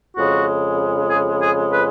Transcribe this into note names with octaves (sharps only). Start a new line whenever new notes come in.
F2 C#3 G#3 F#4
G#4
G#4
B4